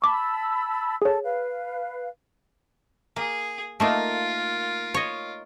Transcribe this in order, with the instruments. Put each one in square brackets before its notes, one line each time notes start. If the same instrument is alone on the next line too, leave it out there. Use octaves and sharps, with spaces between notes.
[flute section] A5 B5 E6 [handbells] C#6 D6
[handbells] G#4 C#5 [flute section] A4 A5
[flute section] B4 F5
[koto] A#3 [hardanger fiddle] G#4
[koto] A3 A#3 D#4 [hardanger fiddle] F4 A#4
[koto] C#5 D#5